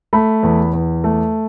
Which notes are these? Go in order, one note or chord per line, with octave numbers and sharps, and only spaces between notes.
A3 B5
E2
E2
A3